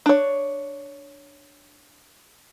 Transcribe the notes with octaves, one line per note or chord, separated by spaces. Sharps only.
D4 C#5